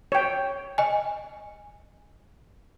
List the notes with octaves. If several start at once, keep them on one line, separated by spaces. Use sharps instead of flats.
C#5 G5
D#5 G#5